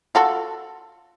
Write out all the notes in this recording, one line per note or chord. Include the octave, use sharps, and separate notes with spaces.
F4 F#4 A4